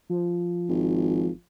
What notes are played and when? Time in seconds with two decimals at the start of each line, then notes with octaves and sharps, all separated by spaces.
0.09 F3
0.69 G#1